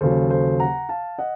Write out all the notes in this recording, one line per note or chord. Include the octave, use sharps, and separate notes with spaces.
D#2 C#3 F#3 A4 C5
A4 C5
F#5 A#5
F5 A5
D#5 F#5